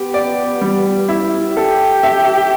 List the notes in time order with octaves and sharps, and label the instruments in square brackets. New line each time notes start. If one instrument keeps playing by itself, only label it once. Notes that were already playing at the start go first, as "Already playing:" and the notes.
Already playing: [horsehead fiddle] B3 [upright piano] G4
[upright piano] D5
G3
E4
[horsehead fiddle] G4 [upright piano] A4
[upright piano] E5